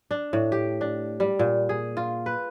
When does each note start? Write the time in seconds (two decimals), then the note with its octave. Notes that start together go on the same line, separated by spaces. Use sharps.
0.11 D4
0.33 A2
0.52 G4
0.81 D4
1.20 G3
1.39 A#2
1.69 G#4
1.97 F4
2.26 B4